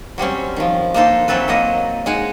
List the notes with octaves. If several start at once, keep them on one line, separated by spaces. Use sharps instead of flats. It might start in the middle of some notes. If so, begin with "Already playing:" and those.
F#3 G3 C4 C#4
D#3 F3
A#3 D4 D#4 A4 C5
E3 F#3 C4 A4 B4
F#3 A#3 D#5
G#3 D#4 G#4 F#5